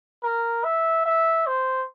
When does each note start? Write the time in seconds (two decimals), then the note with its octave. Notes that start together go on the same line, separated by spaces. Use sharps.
0.23 A#4
0.64 E5
1.06 E5
1.47 C5